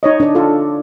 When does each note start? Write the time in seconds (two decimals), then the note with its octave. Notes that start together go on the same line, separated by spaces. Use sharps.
0.03 D#4 C#5 D#5
0.20 D4 D5
0.35 F4 A4